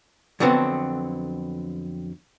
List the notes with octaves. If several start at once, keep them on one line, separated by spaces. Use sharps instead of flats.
F2 D3 F#3 B3 C4